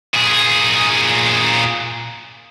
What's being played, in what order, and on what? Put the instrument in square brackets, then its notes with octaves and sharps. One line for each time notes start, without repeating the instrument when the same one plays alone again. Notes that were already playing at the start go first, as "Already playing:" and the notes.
[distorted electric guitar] A#2 G#4